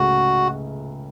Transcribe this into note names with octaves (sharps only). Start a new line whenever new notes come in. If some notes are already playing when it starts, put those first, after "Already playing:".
Already playing: C#2 C#3 A3 F#4